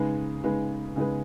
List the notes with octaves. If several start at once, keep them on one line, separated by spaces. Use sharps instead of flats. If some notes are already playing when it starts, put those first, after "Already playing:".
Already playing: C#3 G#3 D#4 G#4 B4
C#3 G#3 D#4 G#4 B4
C#3 G#3 D#4 G#4 B4